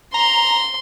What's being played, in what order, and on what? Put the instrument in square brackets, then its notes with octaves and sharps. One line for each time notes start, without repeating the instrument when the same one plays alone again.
[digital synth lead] A#5 [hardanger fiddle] C6